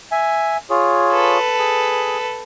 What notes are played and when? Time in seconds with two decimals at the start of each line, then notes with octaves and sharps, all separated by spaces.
0.11 E5 G#5
0.70 F4 G#4 C#5
1.12 A4 B4
1.59 G#4